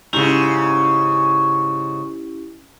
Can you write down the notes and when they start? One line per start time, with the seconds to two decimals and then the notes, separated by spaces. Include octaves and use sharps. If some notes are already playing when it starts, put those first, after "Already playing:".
0.13 G#2 C#3 C#4 E4 G4